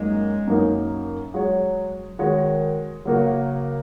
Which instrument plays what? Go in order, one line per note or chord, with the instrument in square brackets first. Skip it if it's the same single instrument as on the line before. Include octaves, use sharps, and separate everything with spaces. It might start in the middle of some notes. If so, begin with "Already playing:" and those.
Already playing: [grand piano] F#2 F#3 A#3 D#4 [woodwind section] G#3
[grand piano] F#2 F#3 A#3 D#4
[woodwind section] F#3 [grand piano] G#3 F#4 C#5
[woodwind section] D#3 [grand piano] G#3 F#4 C#5
[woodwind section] C#3 [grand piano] F#3 A#3 F#4